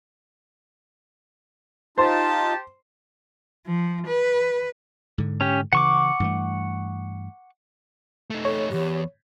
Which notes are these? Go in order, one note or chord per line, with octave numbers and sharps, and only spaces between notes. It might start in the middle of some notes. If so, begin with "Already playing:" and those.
D#4 F4 G4 C5 A5
F3
B4
G#2 D3
C#4 G4
C#3 E3 F#5 C#6 D6
G2 E3 A3
A3 D#4
A4 C#5
E2 G2 G4